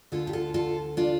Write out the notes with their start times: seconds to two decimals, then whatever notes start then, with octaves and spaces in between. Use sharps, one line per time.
0.12 D2 D3 F4 A4
0.27 G4
0.33 F4 A4
0.54 F4 A4
0.97 D4 F4